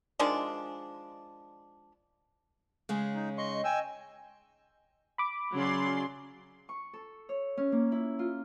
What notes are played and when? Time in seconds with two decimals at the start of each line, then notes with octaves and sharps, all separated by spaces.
0.19 D#3 F3 G#3 D4
2.89 C#3 G#3
3.15 D#4
3.38 D#5 C6 C#6
3.64 G5 G#5 E6
5.18 B5 D6
5.54 C#3 F#3 D5 C6
6.69 C#6
6.94 A4
7.29 C#5
7.57 C#4
7.72 A#3
7.92 E4
8.19 F4